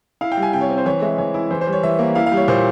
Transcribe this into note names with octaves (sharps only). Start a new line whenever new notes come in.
E4 F5
G5
G3
G#5
C3 G5
C#5
C4
C5
E3 C#5
G#3 E5
E3 C#5
E4
E3 C5
C5
G3
C#5
E3 E5
A#3
E4 F5
F5
G3
C#5
A#2 C5